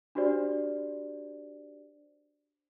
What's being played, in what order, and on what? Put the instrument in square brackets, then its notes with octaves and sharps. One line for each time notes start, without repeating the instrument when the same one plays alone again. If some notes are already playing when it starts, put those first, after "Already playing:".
[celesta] D4 F#4 G4 C5 D5